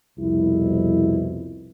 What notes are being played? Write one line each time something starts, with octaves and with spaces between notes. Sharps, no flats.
C2 F2 B2 E4